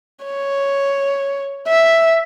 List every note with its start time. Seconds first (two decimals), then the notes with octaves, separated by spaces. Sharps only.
0.25 C#5
1.68 E5